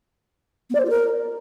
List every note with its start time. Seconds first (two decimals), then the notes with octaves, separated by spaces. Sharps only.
0.69 B3
0.75 D5
0.80 C5
0.85 F4
0.90 A#4